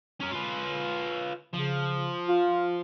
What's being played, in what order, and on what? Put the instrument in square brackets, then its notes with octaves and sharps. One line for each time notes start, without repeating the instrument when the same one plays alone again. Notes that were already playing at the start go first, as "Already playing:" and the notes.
[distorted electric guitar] C#4 A#4
F4 B4
[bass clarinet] C#3 [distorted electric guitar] F3
[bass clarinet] F4